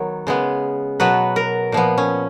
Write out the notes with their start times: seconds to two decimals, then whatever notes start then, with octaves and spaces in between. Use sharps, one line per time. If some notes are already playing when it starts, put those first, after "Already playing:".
Already playing: D#3 F#3 B3 C#5
0.27 C#3 G#3 B3
1.00 B2 F#3 B3 B4
1.36 A#4
1.72 A#2 F3 B3
1.98 C#4